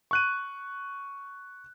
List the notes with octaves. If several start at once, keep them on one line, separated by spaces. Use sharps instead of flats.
C#6 F#6 D#7